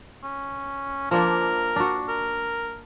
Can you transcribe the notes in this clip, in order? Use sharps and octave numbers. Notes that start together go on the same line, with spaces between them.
C#4
F3 A#3 D4 A#4
D4 F#4
A#4